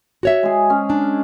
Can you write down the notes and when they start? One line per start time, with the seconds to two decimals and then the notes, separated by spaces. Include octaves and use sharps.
0.23 F#4 C#5 E5
0.43 G#3 G#4
0.70 C#4
0.90 D4